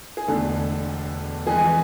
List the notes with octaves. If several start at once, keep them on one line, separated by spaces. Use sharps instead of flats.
G#4
E1 E2 D3 A3 A4
F2 E3 G#3 G#4